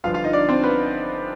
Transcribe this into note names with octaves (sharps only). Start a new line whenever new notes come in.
G1 G2 F3 F4 F5
F4 F5
D#4 D#5
D4 D5
C4 C5
B3 B4